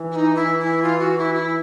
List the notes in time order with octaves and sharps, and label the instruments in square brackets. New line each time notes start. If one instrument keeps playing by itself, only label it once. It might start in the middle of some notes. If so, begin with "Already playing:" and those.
Already playing: [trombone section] E3
[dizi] E4
D#4
E4
E4
F4
F#4
E4
E4